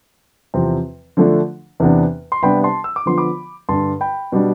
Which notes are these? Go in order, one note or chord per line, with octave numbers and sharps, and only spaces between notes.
E2 C3 F3 C4
D3 F3 A3 D4
E2 C3 E3 B3 D4
C6
C3 G3 B3 D4 G5 B5
A5 C6
E6
D6
D3 F3 B3 C6
B5 D6
G2 D3 G3 D4 A5 C6
G5 B5
B2 G3 D4